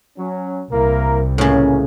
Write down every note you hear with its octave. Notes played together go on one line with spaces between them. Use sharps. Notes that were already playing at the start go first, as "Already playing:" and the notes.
F#3 C#4
C2 A#3 E4 A#4
C#2 A2 C#3 A#3 C#4